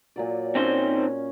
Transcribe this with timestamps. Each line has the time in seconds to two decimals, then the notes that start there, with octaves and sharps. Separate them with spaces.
0.16 A#2 F#3 D5
0.55 C4 C#4 D#4 C5 F5